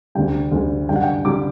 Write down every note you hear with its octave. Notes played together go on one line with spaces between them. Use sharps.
D2 D3 G3 G5
D2 D3 G3
G2 D3 G3 G5
F#5
G5
D3 G3 D6